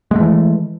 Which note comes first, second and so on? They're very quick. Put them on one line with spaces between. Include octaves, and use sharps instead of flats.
G#3 A3 E3